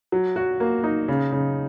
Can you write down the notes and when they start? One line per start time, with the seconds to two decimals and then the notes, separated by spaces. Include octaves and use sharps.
0.12 F#3
0.36 F#4
0.60 A#3
0.84 D#4
1.08 C#3
1.32 C#3